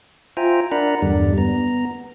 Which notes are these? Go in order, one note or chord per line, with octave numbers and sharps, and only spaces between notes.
F4 C5 E5 G5 G#5 A#5
D4 A#4 D5 F#5 A#5 B5
E2 G2 D3 G3 D5
B3 A#5